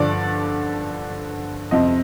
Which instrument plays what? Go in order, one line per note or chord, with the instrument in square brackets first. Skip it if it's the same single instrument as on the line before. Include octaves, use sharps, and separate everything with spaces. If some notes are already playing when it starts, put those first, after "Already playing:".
Already playing: [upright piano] G2 D3 F3 D5
F2 C3 F3 D#5